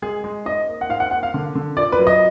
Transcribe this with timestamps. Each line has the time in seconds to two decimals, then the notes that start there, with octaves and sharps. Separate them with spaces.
0.02 G#3 G#4
0.24 G#3
0.45 G#2 D#5
0.67 A#3
0.81 F#5
0.89 G#2 F5
1.00 F#5
1.11 A#3 F#5
1.23 F5
1.34 D3
1.55 D3
1.77 A#2 D5
1.92 B4
1.99 F#3
2.07 D#5